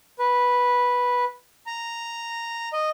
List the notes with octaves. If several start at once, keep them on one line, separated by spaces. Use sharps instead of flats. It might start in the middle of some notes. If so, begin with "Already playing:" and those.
B4
A#5
D#5